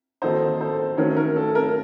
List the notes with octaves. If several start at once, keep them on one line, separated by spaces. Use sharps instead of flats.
D#3 F#3 A#3 D#4 A4 C5
A4 C5
D#3 F#3 A3 C#4 A#4 C#5
A#4
A4
A#4